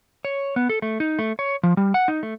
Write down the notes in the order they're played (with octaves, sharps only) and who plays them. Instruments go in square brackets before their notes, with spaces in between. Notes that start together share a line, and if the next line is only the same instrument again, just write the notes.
[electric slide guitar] C#5
B3
A4
A3
D#4
A3
C#5
F3
G3
F#5
D#4
A3